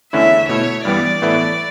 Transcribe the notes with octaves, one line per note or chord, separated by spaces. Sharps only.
E2 D3 A3 C#4 E4 E5
B2 A3 E4 C#5
G2 E3 G3 B3 D5
A2 E3 B3 E4 A4